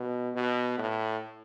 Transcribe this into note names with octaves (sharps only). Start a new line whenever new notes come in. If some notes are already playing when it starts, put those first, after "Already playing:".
Already playing: B2
B2
A2